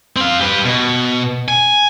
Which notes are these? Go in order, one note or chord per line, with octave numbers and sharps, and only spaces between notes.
C4 F5
G4 B4
B2
G#5